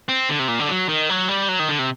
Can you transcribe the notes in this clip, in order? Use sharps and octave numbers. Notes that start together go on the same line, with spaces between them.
C4
D3
C3
A#2
D3
F#3
D#3
F#3
G3
F#3
D#3
D3
C3